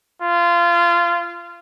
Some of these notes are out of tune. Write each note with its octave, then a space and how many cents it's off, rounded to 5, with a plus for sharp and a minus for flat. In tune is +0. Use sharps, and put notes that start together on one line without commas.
F4 -20